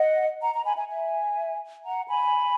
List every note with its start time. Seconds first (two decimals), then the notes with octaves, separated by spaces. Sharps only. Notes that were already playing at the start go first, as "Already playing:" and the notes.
Already playing: D#5 F#5
0.41 F#5 A#5
0.53 A#5
0.64 G#5 B5
0.76 E5 G#5
0.88 E5 G#5
1.84 F#5 A#5
2.08 G#5 B5